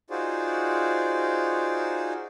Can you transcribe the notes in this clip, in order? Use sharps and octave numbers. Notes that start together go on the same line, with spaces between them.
D#4 F4 F#4 G#4 C5 D5